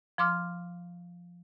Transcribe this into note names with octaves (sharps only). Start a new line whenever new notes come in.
F3 C6 D6 F6